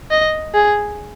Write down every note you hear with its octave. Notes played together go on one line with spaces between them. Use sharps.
D#5
G#4